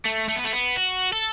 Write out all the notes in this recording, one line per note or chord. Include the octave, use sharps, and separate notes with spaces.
A3
A3
B3
A3
B3
F#4
A4